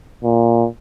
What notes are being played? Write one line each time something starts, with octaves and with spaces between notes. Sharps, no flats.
A#2